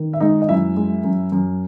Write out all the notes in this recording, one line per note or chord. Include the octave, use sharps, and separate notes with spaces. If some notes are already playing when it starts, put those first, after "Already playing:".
Already playing: D#3
E5
G#3 D#4 D#5
D#5
F#2 E4 E5
G#3
F#2
F#2